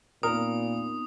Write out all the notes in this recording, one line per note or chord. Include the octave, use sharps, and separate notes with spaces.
A#2 B3 C4 D#4 A#4 D#6